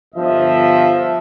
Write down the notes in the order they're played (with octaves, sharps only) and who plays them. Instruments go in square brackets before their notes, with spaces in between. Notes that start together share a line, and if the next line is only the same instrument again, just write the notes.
[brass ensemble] G1 F3 D#5 E5